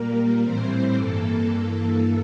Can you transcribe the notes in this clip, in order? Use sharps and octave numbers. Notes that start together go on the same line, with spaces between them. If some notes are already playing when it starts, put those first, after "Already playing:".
Already playing: A#2 G3 A#3 A#4
A2 E3 G3 C4 C5
G2 E3 A#3 A4